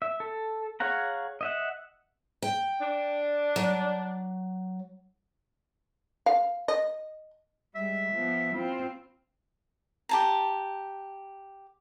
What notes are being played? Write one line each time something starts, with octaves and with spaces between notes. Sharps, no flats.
E5
A4
G#4 C#5 F5 F#5 A#5
D#5 E5 F#5
G5
D4
F#3
F5
D#5
G3 G#3 E5
F3 B3
C4 E4 F4
G4 A5 A#5